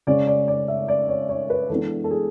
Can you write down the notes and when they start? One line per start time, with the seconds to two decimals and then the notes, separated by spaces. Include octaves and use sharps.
0.07 C#3 G#3 C#4 D5
0.27 D5
0.48 D5
0.68 E5
0.88 D5
1.09 C#5
1.29 C#5
1.50 B4
1.70 E3 G#3 B3 D4 A4
2.04 A4
2.11 G#4